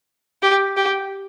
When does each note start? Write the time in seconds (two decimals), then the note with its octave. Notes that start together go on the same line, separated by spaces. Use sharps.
0.43 G4
0.77 G4